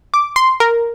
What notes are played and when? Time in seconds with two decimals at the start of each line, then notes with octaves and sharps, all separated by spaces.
0.14 D6
0.36 C6
0.60 A#4